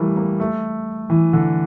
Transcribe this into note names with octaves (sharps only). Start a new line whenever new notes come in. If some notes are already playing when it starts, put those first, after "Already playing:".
Already playing: E3 G3 A3 A#3
A#3
A3
E3
D3